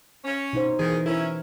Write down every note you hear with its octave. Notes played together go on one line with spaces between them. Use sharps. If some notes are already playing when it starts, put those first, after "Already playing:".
C#4
B2 D#4 C5
D#3 E3 G#4
C#4 E4 A#4